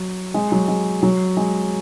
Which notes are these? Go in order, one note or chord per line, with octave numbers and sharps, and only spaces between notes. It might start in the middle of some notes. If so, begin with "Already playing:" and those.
Already playing: F#3
G#3
F#3
G#3
F#3
G#3